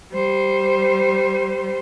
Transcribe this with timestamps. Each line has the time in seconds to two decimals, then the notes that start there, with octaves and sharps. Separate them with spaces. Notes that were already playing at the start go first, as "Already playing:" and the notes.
0.12 G3 C5